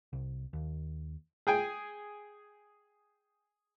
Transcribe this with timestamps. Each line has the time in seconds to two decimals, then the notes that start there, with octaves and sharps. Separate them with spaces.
0.13 C2
0.53 D#2
1.47 G#4 G5 G#5